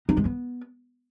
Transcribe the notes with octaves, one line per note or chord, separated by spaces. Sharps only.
D#4
G#3
B3